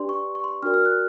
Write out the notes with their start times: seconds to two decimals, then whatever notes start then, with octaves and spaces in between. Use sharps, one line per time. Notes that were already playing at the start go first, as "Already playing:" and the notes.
Already playing: D4 G4 B4 D5 C6
0.09 C#6
0.35 C#6
0.44 C6
0.63 D4 F#4 A#4 D5 F6
0.74 F6
0.85 F#6